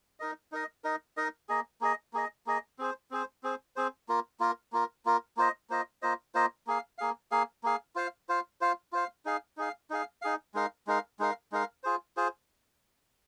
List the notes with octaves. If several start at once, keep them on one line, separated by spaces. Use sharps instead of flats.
D#4 A#4 D#5
D#4 A#4 D#5
D#4 A#4 D#5
D#4 A#4 D#5
A#3 G#4 D#5
A#3 G#4 D#5
A#3 G#4 D#5
A#3 G#4 D#5
C4 G#4 C5
C4 G#4 C5
C4 G#4 C5
C4 G#4 C5
A#3 F4 A#4
A#3 F4 A#4
A#3 F4 A#4
A#3 F4 A#4
A#3 F4 C5 D#5
A#3 F4 C5 D#5
A#3 F4 C5 D#5
A#3 F4 C5 D#5
A#3 G#4 F5
A#3 G#4 F5
A#3 G#4 F5
A#3 G#4 F5
F4 C5 F5
F4 C5 F5
F4 C5 F5
F4 C5 F5
D#4 G#4 F5
D#4 G#4 F5
D#4 G#4 F5
D#4 G#4 F5
G#3 D#4 A#4 F5
G#3 D#4 A#4 F5
G#3 D#4 A#4 F5
G#3 D#4 A#4 F5
F4 G#4 C5
F4 G#4 C5